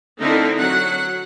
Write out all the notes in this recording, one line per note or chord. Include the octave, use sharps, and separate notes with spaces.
D3 A3 C4 D#4 E4 A#4
F#3 F#5